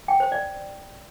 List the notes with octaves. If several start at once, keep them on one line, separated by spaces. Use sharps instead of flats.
G5
C5
D5